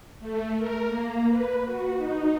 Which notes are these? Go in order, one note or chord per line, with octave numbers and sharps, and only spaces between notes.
A3
A#4
A#3
B4
F#4
D#4